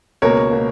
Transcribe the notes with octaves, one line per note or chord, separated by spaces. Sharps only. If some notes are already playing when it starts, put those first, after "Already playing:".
C#2 B2 A#3 A#4 C#5
B2 A#3